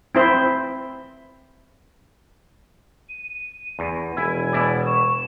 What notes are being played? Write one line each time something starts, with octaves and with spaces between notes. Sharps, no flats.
C4 E4 C5
D#7
E2
E1 E4 G#5
B2 E4 D5
C#6 E7